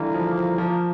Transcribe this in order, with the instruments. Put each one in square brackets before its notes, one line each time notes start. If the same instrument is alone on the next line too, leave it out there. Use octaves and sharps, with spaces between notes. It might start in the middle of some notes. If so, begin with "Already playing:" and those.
Already playing: [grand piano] D3 E3 G3 A3 [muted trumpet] A#3
[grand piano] F3
F3
F3